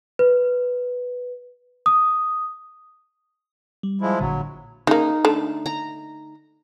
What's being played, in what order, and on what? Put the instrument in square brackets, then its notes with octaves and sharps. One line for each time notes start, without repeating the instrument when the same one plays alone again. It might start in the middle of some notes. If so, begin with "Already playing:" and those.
[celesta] B4
D#6
[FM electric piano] G3
[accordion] F3 G#3 E4
[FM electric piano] A1 A#2 D3 [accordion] F#3
[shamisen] C#3 A#3 [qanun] D#4
[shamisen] D3 A3
[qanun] A#5